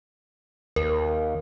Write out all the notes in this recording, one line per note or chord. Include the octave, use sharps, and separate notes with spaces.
D#2 A#4